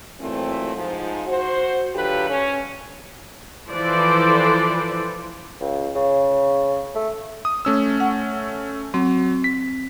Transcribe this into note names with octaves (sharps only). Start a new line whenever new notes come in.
A#2 E3 F#3 A3 C4
G#2 F3
F#4 C5
D3 F#3 F4 G4 A4 B4
C#4
E3 F3 A4 B4 C5 D5
C#2
C#3
A3
D#6
A3 C#4 E6
F#5
F#3 C4
B6